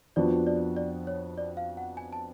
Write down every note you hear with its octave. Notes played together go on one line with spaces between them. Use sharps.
F2 F3 B3 D4 F#4 D5
D5
D5
C#5
D5
F5
F#5
G#5
A5